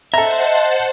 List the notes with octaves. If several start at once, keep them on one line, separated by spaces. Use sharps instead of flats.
A4 C5 D#5 E5 F#5 A5 A#5